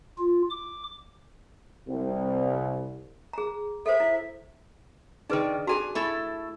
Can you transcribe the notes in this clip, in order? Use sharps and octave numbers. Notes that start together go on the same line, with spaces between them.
F4
D6
C2
G#4 A#5
A4 C5 E5
E4
D#3 D4 D#4 G#4 B4
D4 F#4 G#4 A4 G#5 A#5
A3 E4 A4 B5